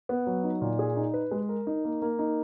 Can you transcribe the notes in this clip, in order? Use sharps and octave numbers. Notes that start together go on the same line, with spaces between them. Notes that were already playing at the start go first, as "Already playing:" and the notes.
B3
F#3
D#4
A#2
G#4
D#4
B4
G#3
A#4
D#4
A#3
A#3
D#4